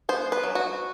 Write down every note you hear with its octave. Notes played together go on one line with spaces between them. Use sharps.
B3 C5
B4
F#3
F#4